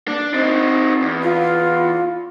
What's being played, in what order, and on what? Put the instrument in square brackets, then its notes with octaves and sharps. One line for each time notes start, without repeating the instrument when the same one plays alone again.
[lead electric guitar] D4
C4 D#4
E2
[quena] F4